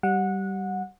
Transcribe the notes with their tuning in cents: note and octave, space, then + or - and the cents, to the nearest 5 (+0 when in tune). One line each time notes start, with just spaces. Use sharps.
G3 -15 F#5 -20